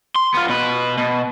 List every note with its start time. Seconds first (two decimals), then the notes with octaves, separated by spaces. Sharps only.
0.16 C6
0.34 B3 F4
0.49 B2 B4
0.98 B2